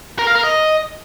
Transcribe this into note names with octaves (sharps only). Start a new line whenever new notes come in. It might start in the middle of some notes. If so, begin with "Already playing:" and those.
A#4
F5
A#4
D#5